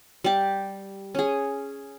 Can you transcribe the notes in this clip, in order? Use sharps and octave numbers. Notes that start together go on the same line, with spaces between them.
G3 G4
C#4 G#4